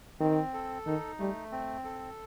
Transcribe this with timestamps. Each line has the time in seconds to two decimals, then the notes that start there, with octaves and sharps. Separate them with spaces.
0.20 D#3 C4
0.54 A4
0.86 D#3 D#4
1.19 G3 A3
1.52 C4
1.85 A4